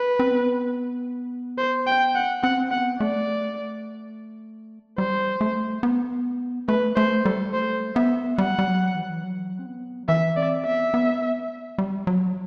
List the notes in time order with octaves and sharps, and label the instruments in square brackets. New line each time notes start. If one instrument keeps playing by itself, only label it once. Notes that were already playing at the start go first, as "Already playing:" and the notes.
Already playing: [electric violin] B4
[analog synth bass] C4
B3
[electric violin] C5
G5
F#5
[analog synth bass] C4 [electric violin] F#5
[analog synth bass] B3 [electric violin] F#5
[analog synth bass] A3 [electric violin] D5
[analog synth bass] G3 [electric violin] C5
[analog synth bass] A3
B3
[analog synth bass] A3 [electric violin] B4
[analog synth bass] A3 [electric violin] C5
[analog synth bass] G3 [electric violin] A4
[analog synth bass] A3 [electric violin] C5
[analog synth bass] B3 [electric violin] E5
[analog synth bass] G3 [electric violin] F#5
[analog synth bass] G3
F#3
E3
F#3
E3
F#3
C4
B3
F#3
[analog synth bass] E3 [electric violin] E5
[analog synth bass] C4 [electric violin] D5
[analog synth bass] B3 [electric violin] E5
[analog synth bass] B3
G3
F#3